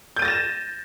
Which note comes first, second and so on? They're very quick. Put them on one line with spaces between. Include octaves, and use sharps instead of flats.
G6 D#7 A6 A#6 E7